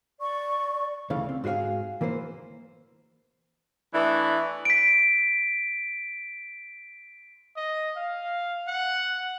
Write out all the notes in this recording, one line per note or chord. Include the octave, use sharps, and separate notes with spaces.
D5 C#6
D2 C#3 E3 A3 F5
C4
G#2 F#4 G#4 C#5 F5
E3 A#3 B4 C5
E3 A3 B3 D4 E4
B6 D7
D#5
F5
F#5